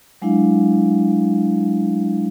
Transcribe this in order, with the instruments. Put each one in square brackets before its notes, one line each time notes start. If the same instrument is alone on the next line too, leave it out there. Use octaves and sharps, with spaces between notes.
[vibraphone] F#3 G#3 D4 E4 F5